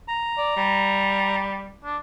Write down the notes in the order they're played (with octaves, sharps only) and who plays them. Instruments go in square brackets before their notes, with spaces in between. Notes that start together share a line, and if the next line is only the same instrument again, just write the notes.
[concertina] A#5
[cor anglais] D5
G3
D4